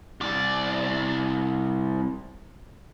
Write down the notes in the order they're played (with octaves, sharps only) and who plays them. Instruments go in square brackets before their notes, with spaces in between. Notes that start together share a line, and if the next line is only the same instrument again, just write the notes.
[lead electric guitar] C2 D5